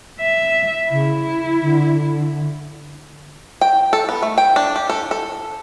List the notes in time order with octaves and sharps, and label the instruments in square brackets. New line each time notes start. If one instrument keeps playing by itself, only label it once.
[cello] E5
[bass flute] C#3 [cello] E4
[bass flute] D3
[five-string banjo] G5
A4
B3
A3
G5
D4
G4
A4
A4